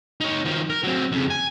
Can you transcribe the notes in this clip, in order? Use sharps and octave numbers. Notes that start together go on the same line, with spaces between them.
D#4 C#5
D#3 F3
A#4
F#3 C4
F2 C#3
G#5